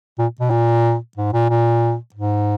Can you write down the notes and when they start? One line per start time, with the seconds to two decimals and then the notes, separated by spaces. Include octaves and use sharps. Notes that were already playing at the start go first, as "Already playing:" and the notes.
0.19 A#2
0.40 B2
0.50 A#2
1.17 G#2
1.34 A#2
1.50 A#2
2.15 G#2